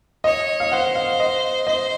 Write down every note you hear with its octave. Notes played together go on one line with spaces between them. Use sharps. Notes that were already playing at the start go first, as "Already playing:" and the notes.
C#5 D#5
F5
C5 F#5
F5
D#5
C5 D#5